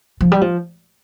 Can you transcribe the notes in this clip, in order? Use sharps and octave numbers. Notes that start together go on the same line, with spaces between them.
F3
G3
F3